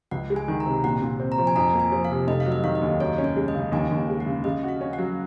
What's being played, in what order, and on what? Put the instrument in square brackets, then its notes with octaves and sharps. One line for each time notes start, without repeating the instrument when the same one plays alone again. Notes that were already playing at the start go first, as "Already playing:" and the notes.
[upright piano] C#2 [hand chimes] F#5
[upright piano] G#3
[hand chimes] G#5
[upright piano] D#3
[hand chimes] A#5
[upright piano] C3
[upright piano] A#2 [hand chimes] F#5
[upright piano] A#2
C4
[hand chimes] A#5
[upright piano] F3
[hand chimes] G#5
[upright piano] F2 [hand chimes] A#5
[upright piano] A#3
[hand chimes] G#5
[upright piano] F3
[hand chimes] F5
[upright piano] C3
[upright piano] F1 [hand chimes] D#5
[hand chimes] F5
[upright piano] F#3
[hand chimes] D#5
[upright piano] D#3 [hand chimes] F5
[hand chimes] D#5
[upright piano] D#2
[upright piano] F#2 [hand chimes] C#5
[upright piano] C#4
[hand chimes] C#5
[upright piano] G#3
[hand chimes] D#5
[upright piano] C#3
[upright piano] D#2 [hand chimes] G#5
[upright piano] D#2
G#3
[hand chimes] F#5
[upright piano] C#3
[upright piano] C#3 [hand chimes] D#5
[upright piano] F#4
[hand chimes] F5
[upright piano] C#4
[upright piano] F#3 [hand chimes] F#5